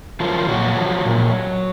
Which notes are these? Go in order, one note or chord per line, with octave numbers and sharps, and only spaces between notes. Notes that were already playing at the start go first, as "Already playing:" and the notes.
D#3 F3 F#3 F4
A#2 F#3 F#4
F3
A#2